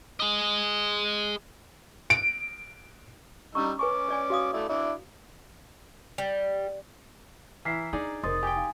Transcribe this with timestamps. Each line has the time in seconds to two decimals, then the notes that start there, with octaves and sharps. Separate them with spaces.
0.20 G#4 D#5
2.10 D7
3.55 G3 C#4 D#4 A#5 C#6 E6
3.79 C#4 B4 G#5 C#6 D6
4.08 C#5 D5 G#5
4.30 F#4 F5 D#6
4.53 A3 E4 D5
4.69 D4 E4 D5
6.18 G3
7.65 E3 E5 A#5 F6 B6 C7
7.93 D4 D#4 G#4 D5
8.23 F1 A#4 C5 D#5 C6 D#6 A6
8.43 G4 G5 G#5
8.56 D#4 F5